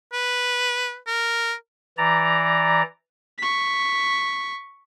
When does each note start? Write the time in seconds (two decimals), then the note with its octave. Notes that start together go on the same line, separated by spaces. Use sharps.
0.13 B4
1.07 A#4
1.97 E3 D5 A#5
3.38 C#6 B6